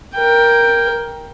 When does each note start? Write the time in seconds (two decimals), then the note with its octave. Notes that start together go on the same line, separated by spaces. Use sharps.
0.14 A#4 G5